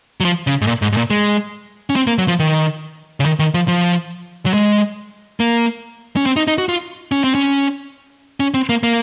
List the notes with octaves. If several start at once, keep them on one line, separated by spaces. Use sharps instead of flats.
F#3
F3
C#3
G#2
A#2
G#2
G#2
A#2
G#3
C#4
C4
A#3
F#3
F3
D#3
C#3
D#3
D#3
F3
F3
F#3
G#3
A#3
C#4
C4
D#4
D#4
F#4
F4
C#4
C4
C#4
C#4
C4
A#3
A#3